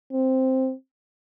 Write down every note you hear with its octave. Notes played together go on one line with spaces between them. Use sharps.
C4